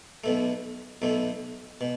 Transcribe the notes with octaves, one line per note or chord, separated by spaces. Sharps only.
B1 B2 A3
B1 B2 A3
B2